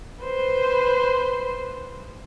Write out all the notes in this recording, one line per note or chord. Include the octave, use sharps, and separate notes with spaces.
B4 C5